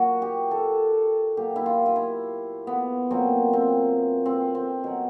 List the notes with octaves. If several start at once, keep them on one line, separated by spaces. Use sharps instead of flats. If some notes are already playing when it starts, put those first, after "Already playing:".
Already playing: A#2 F#3 F#4
G4
A4
A#2 F#3 G4
E4
F4
F4
E4
B3
A#2 F#3 C4
C4
C4
C4
B2 F#3